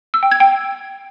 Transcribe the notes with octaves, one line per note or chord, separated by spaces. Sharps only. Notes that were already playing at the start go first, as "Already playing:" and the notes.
E6
G5
G#6
G5